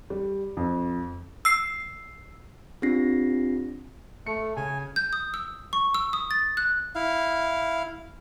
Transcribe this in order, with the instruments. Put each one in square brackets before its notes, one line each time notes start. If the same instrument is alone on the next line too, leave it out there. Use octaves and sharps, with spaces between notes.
[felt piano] G3
F2
[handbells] E6 C7
[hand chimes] C4 D4 F4 G4 A#6 C7
[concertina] A3 [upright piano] C#7
[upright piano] C#3 [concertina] G#5
[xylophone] G6
D#6
E6
C#6
E6
D#6
A6
F#6
[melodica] E4 F5